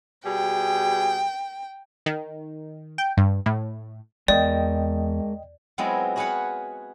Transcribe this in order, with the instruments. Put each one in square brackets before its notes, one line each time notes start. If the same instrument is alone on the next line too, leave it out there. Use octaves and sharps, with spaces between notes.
[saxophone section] B2 G3 G#4 [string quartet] G5
[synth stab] D#3
G5
G2
A2
[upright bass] E2 [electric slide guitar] G#3 A#4 [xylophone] D5 [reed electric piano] D#5 G5
[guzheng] F#3 G#3 B3 C4 E4 F4
F#4 G#4 B4 C#5 F5 F#5